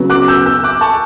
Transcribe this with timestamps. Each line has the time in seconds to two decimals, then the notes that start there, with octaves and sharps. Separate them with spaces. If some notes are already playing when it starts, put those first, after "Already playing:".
Already playing: C#3 F#3 B3
0.10 D6 F#6
0.28 E6 G6
0.46 E6 G6
0.64 D6 F#6
0.81 A5 C#6